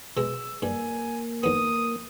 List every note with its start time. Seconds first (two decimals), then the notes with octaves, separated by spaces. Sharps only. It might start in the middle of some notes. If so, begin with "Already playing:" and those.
0.17 B2 G#3 E6
0.62 G2 A#3 G#5
1.43 D#2 B3 D#6